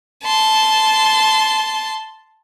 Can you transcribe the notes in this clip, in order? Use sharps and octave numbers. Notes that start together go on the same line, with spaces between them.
A5 C6